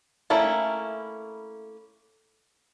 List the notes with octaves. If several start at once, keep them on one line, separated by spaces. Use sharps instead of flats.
A3 A#3 C#4 E4